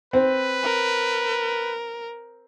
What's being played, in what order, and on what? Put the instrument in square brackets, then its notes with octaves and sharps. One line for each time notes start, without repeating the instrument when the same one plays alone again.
[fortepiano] C4 [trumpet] B4
[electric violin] A#4